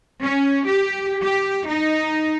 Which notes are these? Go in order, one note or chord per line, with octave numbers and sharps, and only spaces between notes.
C#4
G4
G4
D#4